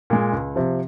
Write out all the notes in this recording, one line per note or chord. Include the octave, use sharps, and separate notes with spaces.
A#2 G#3
C#2
C3 F3